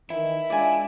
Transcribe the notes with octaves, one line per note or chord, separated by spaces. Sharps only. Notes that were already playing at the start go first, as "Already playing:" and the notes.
D#3 E3 E4 E5
G#3 D4 F4 D5 G#5